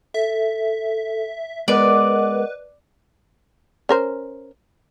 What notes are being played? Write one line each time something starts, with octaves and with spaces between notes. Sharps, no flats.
A4 E5
G#3 B3 A#4 B4 D5 D#5 F#5
C#4 A#4 C5